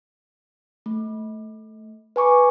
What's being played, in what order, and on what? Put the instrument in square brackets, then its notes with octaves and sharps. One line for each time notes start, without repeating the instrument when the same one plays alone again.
[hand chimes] A3
B4 G#5 C#6 D6